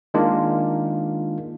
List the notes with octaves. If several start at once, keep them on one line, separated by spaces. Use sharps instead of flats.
D#3 G#3 A#3 D4 F4